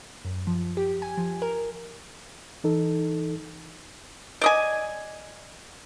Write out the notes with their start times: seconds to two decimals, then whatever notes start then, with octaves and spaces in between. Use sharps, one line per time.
0.25 F#2
0.47 F3
0.77 G4
1.02 G#5
1.17 F3
1.42 A#4
2.64 E3 D#4 A4
4.41 D5 D#5 G#5